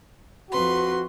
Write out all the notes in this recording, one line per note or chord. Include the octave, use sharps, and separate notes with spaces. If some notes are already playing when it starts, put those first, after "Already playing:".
F2 F#4 B4 C6